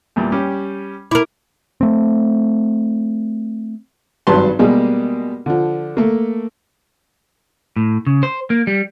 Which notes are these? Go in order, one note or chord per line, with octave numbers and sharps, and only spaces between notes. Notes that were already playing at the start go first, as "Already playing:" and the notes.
E2 A#2 G3
G3 C#4 G4
E4 A#4 D6
A3 C4
G#1 G2 F#3 B4 A5 C6
B2 G3 G#3 A#3
D3 F3
A3 A#3
A2
C#3
C5
A#3
G3